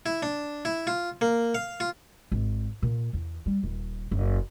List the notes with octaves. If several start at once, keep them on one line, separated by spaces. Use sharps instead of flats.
E4
D4
E4
F4
A#3
F5
F4
G#1
A#2
E2
G3
D#1
F#1